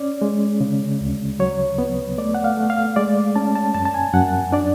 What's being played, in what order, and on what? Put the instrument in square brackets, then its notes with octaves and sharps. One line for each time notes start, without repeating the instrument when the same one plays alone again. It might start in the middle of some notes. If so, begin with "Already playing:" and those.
Already playing: [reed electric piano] C#4 D5
G#3
C#3
D2
F#3 C#5
B3
A3 D5
F#5
F5
A3
F5
G#3 D5
C#4 A5
A5
F#2 A5
A5
G#5
F#2 F#5
D4 D5